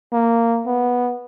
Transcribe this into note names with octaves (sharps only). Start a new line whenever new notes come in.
A#3
B3